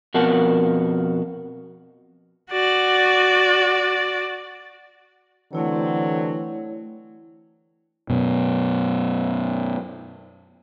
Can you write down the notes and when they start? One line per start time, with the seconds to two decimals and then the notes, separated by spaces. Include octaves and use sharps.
0.14 F2 B2 A#4 F#5 A5
2.51 F#4 D5
5.53 D3 E3 F#3 A3 C4 E4 C#5
8.10 F#2 B2